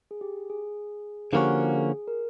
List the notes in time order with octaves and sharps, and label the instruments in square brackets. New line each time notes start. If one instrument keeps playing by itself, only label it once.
[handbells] G#4
G4
G#4
[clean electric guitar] D3 F3 A#3 C#4 F#4 [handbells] G4
[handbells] G#4
A#4